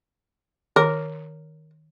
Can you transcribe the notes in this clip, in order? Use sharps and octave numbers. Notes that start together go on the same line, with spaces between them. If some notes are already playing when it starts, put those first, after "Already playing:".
D#3 A#4